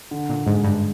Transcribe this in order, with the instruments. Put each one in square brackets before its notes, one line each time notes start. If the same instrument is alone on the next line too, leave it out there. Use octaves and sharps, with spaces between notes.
[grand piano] D3
[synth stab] A#2
[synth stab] G#2 [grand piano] G#3
[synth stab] G2